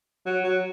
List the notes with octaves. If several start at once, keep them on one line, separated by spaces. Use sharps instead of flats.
F#3
F#3